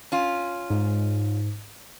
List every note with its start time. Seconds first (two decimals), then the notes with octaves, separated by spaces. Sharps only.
0.12 C#4 F4
0.70 G#2